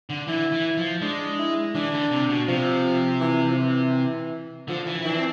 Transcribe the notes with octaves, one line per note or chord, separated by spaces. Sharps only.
D3
E3 E4
E3
F3
G#3 D4
E4
E3 D4
D3
C3
B2
C3 F3
E3
F3
E3
D3 F3
E3
E4
E3 D4
C4